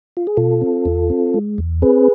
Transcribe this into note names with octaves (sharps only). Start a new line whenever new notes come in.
F4
G#4
B2 F4 A4
C4
E2
C4
G#3
E2
C4 G#4 B4